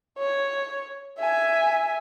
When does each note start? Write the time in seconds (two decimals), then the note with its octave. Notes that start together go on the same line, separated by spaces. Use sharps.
0.18 C#5
1.18 E5 G#5